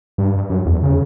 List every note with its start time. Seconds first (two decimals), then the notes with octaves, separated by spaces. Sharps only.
0.18 G2
0.50 F#2
0.66 E2
0.83 C#3